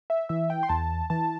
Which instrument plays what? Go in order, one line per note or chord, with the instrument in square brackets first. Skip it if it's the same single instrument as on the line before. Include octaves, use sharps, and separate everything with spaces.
[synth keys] E5
E3 E5
G5
C6
E2 A5
E3 A5